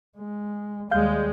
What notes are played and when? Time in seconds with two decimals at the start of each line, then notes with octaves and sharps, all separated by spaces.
0.18 G#3
0.91 D#2 G3 G#3 F5 G6